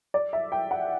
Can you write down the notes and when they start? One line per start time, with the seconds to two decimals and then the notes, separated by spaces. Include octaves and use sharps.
0.14 D5
0.33 E5
0.52 G5
0.71 F#5